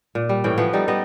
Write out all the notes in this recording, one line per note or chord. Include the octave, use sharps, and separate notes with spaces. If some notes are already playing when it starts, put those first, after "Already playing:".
A#2
G3
A2 E3 C#4 G5
F3 B3 B4
G3 D#4 A4
G3 B3 D#5